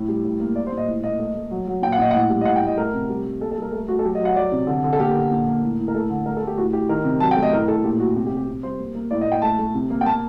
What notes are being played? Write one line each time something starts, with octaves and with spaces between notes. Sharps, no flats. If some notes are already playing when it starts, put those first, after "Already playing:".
Already playing: A2
G3
A2
A#3
G3 D5
C5
A#2
D#5
A2
A#3 D#5
A3 D#5
A3
F#3
F#3
A#2 G5
F#5
A#2 D#5
A2 F#5
G3
D#5
A2 F#5
G5
A2 D#5
A3 A#4
C3
G3
G3
A#3 A4
A4
G3
A#4
A3 A4
A3 F#4
A4
F#3 G4
D#5
F#3 F#5
F#3 D5
C3
D3
D3
A4
A#3 G4
D3
A#2
A#3
A2
A2
A#4
A3 A4
D3
A3 A#4
A4
A3
G4
A2 F#4
A2 G4
D#3 A#4
C3
F#3 A5
G5
A3
D#5
A2 A#4
A2 A4
A#2 G4
A3 F#4
C3 G4
G4
C3
G4
C3
G3 C5
A#3
A#3
A2 D5
D#5
A2
G5
A3 A5
A3
C3
A#3
G5
A#3 A5